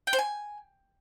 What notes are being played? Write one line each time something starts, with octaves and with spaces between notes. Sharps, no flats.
G5
C5
G#5